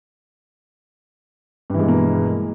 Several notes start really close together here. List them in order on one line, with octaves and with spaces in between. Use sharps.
G2 E3 G#3 B2 A#3